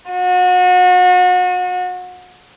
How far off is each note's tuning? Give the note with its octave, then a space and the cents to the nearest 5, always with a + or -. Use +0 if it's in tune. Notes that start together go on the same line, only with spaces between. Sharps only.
F#4 -35